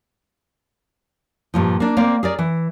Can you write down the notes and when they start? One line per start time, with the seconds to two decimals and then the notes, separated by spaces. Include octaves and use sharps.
1.54 G2 A#2 F3
1.80 A#3 D4
1.97 A#3 C4 D5
2.23 G#4 A#4 D5
2.39 E3